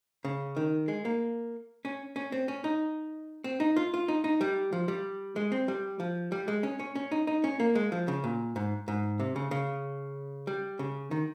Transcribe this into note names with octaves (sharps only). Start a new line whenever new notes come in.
C#3
D#3
G#3
A#3
C#4
C#4
C4
C#4
D#4
C4
D#4
F4
F4
D#4
D#4
G3
F3
G3
G#3
C4
G3
F3
G3
G#3
C#4
C#4
C#4
D#4
D#4
C#4
A#3
G#3
F3
C#3
A#2
G#2
G#2
C3
C#3
C#3
G3
C#3
D#3